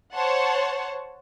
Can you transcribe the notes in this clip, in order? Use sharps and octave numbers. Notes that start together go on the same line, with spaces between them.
C5 C#5 F#5 A5